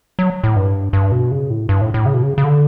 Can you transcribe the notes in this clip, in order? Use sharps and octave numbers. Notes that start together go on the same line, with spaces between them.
F#3
A2
G2
G2
B2
C#3
A2
G2
A2
A2
C#3
B2
C#3
C#3
D3